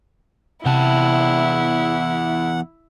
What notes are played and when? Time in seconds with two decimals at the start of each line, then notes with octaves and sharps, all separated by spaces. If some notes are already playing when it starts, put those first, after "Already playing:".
0.65 E2 C3 E4 F#5 G5 A5